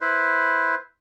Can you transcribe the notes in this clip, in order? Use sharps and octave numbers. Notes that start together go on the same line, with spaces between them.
E4 B4 C5